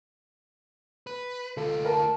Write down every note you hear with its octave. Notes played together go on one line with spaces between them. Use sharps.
B4
D2 F4 A4
A#4 A5